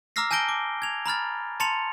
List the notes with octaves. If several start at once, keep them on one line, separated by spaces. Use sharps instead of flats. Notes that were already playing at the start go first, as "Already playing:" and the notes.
A#5 D6 E6 F6 A#6 C7
G#5 A5 G6 A#6 D7 G7
D6
G#6 F7
A#5 B5 F6 A6
A5 A#5 C6 A6 C#7 F7